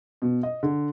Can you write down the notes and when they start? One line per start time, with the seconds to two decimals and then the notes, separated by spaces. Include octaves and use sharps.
0.22 B2
0.43 D#5
0.63 D3